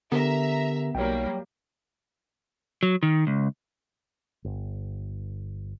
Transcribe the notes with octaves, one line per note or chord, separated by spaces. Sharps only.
D3 B3 G4 A#4 E5 A#5
B1 F#3 G3 A#3 C#5 G5
F#3
D#3
C#2
G1